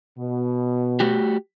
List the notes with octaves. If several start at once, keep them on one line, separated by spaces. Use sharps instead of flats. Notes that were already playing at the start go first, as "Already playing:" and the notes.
B2
A3 F#4 G4